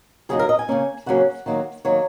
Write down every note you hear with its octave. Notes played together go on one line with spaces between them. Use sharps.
F#2 C#3 F#3 A#3 D#4 G#4
A#4
D#5
G#5
C#3 F#3 A#3 C#4
C#3 F#3 A#3 C#4 F#5
D#2 D#3 F#3 A#3
D#3 F#3 A#3 C#5